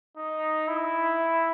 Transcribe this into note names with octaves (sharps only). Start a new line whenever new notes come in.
D#4
E4